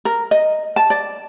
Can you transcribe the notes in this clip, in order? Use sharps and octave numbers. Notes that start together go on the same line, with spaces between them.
A#4
D#5
A5
D5